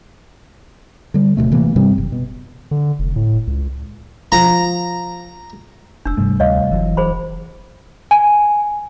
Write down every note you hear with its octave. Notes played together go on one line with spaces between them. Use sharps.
D3 G3
D1 C#2 B2 A3
C3 E3 A3 A#3
G2 C3 G3 C4
F#1
B2
D3
F1
A2
C#2
F3 A#5
F1 D4 E6
G2 C3 G3 A3
D2 C#5 D#5 F5
F#1 E3 F#3
F1 G#4 C5 B5
G#5